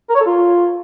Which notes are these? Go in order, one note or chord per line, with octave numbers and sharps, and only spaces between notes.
A#4
C#5
A4
F4